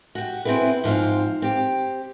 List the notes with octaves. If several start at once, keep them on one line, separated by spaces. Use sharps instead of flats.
F#4 G4
B3 C4 D4 E4 G#4 B4
G#2 F3 C4 F4
C4 G4